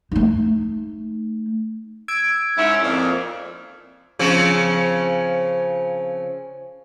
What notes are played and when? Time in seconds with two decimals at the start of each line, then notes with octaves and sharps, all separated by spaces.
0.11 A3 D#4
2.08 E6 G#6 D7
2.57 G#2 C#4 E4
2.83 F2 A#2
4.19 C#3 F3 C4